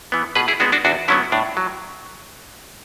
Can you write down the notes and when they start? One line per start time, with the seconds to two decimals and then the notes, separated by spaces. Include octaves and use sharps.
0.12 E3 B3
0.35 B2 G#4 B4
0.48 E4 G#4
0.60 G#3 B3 D4 F#4
0.72 D4 F#4
0.85 E2 D4 F#4
1.08 D3 F#3 B3 C#4 E4
1.32 A2 D4
1.57 F#3